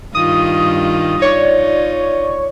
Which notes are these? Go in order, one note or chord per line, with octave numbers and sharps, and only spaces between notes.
G2 D#3 F4 D#6
D#4 F4 C#5 D5 C#6